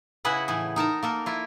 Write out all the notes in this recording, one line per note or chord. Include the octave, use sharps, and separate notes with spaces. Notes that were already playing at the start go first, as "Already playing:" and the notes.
C#3 E4 F#4 G#4 B4 F#5
A2 E3 G#4
D#4 A#4 A5 A#5
A#3 A4 A#4
E4 F4